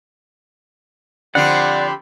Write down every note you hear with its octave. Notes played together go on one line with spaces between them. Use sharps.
D3 F3 C4 G4 D5 F#5 B5 C6